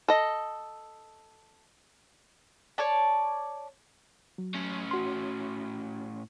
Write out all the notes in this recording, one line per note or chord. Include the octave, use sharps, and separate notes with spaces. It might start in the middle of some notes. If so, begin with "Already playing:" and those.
A4 D#5
C#5 D5 A5
F#3
A2 C#4
F#4 C6